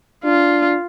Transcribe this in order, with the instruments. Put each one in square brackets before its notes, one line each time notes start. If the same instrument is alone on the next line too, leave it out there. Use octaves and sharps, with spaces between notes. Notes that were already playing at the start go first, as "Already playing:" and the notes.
[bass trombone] D4 [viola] F4